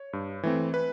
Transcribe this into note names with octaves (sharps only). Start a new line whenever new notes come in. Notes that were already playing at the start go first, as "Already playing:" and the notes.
Already playing: C#5
G2
E3 A3 C4
B4